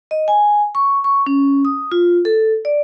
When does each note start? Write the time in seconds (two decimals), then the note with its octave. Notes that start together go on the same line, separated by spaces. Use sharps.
0.11 D#5
0.28 G#5
0.75 C#6
1.04 C#6
1.26 C#4
1.65 D#6
1.92 F4
2.25 A4
2.65 D5